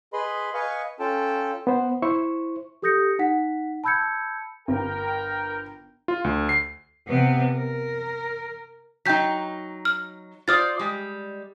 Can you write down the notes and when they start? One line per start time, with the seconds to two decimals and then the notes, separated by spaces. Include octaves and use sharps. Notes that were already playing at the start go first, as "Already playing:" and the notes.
0.13 G#4 B4 D#5 B5 C6
0.54 B4 D#5 F5 G#5 C#6
0.99 C#4 F4 A4 G5 A5
1.67 B3 C5
2.02 E4 C5 C#6
2.82 G4 A4 D#6 G6 A#6 C#7
3.19 D#4 F#5 B6
3.84 A5 B5 E6 G6 G#6 C#7
4.68 G1 A#4 G5
6.08 F4
6.24 D2
6.49 C7
7.08 C3 B3
7.54 A#4
9.06 F#3 D#4 G5 G6 B6
9.85 F6
10.48 F4 C5 D5 D#6 F6 A6
10.79 G3 G#3